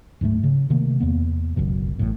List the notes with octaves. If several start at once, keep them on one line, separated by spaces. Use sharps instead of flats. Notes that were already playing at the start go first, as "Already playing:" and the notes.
D1 G#2 G3 A3
C#3
C3 D#3 A3 A#3
E2 A#3 B3
F#1 C#2 F#2 B2
A1 A2